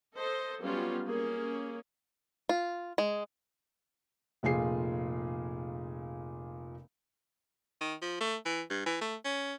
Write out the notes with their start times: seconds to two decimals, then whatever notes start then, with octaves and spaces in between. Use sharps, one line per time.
0.15 A4 C5 D#5
0.62 F#3 G3 B3 C#4 F4
1.06 A#3 C#4 G#4
2.49 F4
2.98 G#3
4.43 F1 A#2 F4 G#4 C7
7.81 D#3
8.02 F3
8.20 A3
8.45 E3
8.70 G2
8.86 E3
9.01 A3
9.25 C#4